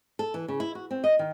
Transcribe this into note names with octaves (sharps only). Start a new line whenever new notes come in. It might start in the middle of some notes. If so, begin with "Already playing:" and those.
A4
E3
C#3
E4
F#4
C4
D#5
D#3